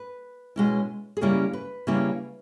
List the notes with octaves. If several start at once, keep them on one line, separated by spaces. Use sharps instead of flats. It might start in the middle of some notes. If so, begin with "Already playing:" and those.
Already playing: B4
B2 G#3 C#4 E4
G#4
C#3 G3 A#3 C#4 E4 A#4
B4
C#3 G3 A#3 C#4 E4